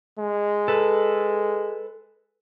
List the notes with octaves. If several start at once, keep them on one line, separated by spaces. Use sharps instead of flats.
G#3
A4 B4